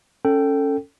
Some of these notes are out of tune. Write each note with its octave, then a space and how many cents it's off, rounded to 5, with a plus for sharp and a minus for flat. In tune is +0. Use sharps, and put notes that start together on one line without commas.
C#4 +0 A4 +15 G5 -10